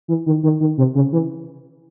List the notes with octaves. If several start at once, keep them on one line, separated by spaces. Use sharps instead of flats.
E3
D#3
D#3
D#3
C3
C#3
E3